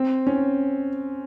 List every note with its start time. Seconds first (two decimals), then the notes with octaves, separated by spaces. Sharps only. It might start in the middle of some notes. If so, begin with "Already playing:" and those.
Already playing: C4
0.27 C#4